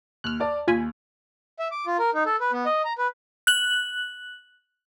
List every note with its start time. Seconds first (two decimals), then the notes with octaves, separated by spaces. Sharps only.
0.24 D#2 F6 F#6
0.40 D5 A5
0.68 D#2 F4 G#5 B5
1.59 E5
1.71 D6
1.86 F4
1.99 A#4
2.14 D#4
2.26 A4
2.41 B4
2.52 B3
2.66 D#5
2.85 A#5
2.98 B4
3.47 F#6 F#7